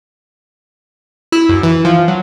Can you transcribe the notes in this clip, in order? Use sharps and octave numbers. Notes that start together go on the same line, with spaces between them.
E4
F#2
E3
F3
F#3